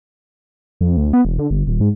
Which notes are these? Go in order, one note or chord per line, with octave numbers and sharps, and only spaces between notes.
F2
D2
B3
E1
D3
G1
D#1
G#2